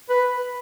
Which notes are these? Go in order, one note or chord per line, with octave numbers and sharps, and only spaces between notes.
B4